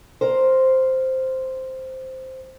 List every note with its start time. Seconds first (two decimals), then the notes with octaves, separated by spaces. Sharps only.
0.21 A#4 C5